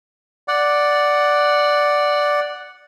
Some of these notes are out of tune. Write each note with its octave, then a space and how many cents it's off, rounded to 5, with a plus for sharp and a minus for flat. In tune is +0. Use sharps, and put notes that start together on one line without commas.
D5 +0 F#5 +0